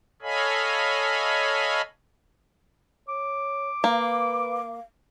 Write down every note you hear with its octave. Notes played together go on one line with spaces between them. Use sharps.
A4 C#5 D#5 F5 G#5 B5
C#5 D6
A#3 B4 F5